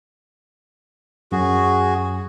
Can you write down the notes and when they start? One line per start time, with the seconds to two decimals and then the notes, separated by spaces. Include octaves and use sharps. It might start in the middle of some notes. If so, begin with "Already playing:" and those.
1.32 F#2 F#4 G#4